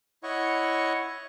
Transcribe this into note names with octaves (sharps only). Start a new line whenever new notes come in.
E4 C#5 D#5 F#5 C#6